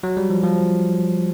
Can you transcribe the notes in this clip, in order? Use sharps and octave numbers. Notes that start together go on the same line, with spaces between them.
F#3
G3
F3
F3